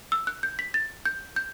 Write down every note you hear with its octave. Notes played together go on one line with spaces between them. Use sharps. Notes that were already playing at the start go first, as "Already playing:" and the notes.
E6
F#6
G6
B6
A6
G6
G6